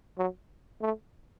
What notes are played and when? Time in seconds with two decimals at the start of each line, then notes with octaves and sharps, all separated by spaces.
0.18 F#3
0.81 A3